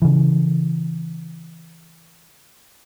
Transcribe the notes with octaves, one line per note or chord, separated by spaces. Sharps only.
C#3 E3